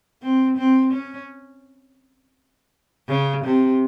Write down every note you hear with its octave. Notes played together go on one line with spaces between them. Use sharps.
C4
C4
C#4
C#3
C3